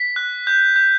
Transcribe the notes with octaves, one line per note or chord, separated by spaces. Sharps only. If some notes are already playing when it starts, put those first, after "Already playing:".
Already playing: B6
F#6
G6
G6